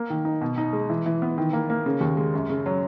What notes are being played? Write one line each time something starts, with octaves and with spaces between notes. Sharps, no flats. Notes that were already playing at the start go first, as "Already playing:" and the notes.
Already playing: A#3
D#3
D#4
B2
D#4
G#3
E3
E3
B3
D#3
A#3
A#3
C#3
D#2
G#3
F#2
C#3
F#3